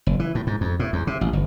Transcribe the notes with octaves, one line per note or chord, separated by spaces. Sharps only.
F#1
E3
A2
G#2
F2
A2
E2
C3
A1
G1